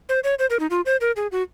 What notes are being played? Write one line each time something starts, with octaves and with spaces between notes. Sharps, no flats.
C5
C#5
C5
A#4
D#4
F4
C5
A#4
G#4
F#4